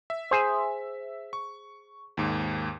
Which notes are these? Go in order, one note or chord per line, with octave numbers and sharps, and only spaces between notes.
E5
G#4 C5
C#6
D#2 G#2